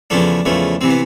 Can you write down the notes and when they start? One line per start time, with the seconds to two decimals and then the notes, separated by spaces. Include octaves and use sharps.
0.10 E2 C#3 F3 A3 D4
0.45 E2 C#3 F3 A3
0.81 C3 E3 C4
0.90 B3